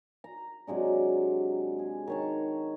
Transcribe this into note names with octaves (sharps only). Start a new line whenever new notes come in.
A#5
C3 F#3 G#3 D4
G#4
D#3 C#5 A5